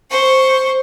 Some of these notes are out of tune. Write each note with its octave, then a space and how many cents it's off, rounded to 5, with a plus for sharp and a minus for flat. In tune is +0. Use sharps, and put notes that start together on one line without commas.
C5 +0 C#6 +0